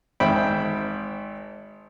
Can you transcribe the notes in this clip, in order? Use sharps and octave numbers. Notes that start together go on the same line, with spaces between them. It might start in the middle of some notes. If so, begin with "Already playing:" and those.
G#1 C4 E5 G5 B5